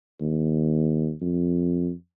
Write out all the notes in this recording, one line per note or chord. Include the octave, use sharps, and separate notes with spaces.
D#2
F2